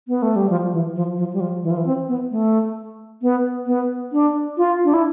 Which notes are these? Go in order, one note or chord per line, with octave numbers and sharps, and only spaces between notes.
B3
A3
G3
F3
E3
F3
F3
G3
F3
E3
F3
E3
C4
B3
A3
B3
B3
D4
F4
D4
E4